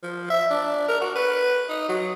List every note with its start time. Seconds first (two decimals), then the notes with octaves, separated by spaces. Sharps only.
0.03 F3
0.30 E5
0.50 D4
0.88 A#4
1.01 F#4
1.16 B4
1.69 D#4
1.89 F#3